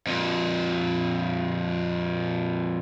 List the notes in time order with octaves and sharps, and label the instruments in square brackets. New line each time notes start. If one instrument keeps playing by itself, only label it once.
[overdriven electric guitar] F2 A#2